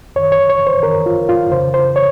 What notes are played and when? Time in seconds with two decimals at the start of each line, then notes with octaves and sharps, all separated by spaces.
0.16 F#2 D#3 C#5
0.32 C#5
0.50 C#5
0.67 C5
0.83 F#2 D#3 A#4
1.06 F4
1.29 F4
1.52 F2 C#3 C5
1.74 C5
1.96 C#5